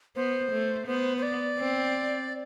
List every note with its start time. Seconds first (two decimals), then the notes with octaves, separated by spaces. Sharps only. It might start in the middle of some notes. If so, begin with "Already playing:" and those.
0.16 B3 C5
0.51 A3
0.87 B3 C5
1.17 C5
1.23 D5
1.59 C4